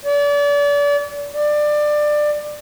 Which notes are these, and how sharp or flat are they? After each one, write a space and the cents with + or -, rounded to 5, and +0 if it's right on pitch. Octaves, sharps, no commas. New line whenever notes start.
D5 -35
D5 +20